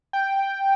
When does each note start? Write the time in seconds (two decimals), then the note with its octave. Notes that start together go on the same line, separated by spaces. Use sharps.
0.13 G5